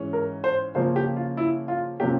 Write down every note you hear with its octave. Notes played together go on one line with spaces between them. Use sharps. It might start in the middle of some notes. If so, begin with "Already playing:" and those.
Already playing: G#2 E3 G#3 C#4
A#4
C5
C#3 F3 A#3 C#4 C5
G4
F4
E4
F4
C3 F3 A#3 C#4 G4